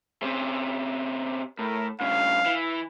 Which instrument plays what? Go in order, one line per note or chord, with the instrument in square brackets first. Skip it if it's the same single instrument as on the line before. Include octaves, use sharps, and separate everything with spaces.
[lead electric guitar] C3 C#4
[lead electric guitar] A2 [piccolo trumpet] A#4
[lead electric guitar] G2 C#3 [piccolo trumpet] F5
[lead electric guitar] E3